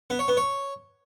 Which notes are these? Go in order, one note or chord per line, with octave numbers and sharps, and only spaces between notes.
B3
C#5
B3
C#5